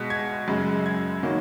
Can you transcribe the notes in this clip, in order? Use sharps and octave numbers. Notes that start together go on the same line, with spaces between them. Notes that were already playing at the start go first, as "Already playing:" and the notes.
Already playing: B2 G#3 B6 C#7
G#6
F#2 C#3 G#3
G#6
D#3 F#3 A#3